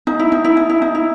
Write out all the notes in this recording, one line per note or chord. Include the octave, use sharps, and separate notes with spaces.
D#4
E4
D#4
E4
D#4
E4
D#4
E4